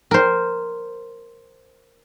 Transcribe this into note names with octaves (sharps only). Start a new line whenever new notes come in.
A#4 C5